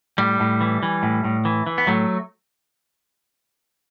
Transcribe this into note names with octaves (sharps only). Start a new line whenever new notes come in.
A2 G3
A2
E3
E3
A2
A2
E3
E3
B3
A2 F#3 A3